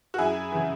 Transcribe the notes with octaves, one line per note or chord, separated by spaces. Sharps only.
F#4
F#2 E4 G#4
C#3 E3